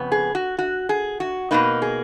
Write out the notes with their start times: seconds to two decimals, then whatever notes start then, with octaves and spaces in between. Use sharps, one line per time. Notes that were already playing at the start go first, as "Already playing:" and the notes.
Already playing: F2 C#3 B3
0.12 G#4
0.35 F#4
0.58 F#4
0.89 G#4
1.20 F#4
1.51 B2 A#3 D#4 B4
1.82 G#4